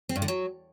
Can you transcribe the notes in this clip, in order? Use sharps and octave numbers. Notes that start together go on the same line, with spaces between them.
C4
G2
D3
F#3